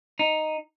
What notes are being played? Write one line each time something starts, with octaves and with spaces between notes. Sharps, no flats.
D#4